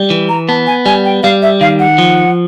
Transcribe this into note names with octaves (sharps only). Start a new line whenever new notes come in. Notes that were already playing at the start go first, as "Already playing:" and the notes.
Already playing: G3
E3
A#5
B3 A5
G#5
G3 G#5
G5
G3 F5
E5
D#3 F5
F#5
F3